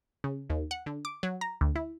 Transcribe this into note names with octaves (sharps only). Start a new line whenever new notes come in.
C#3
D#2
F#5
D3
D6
F#3
A#5
D2
E4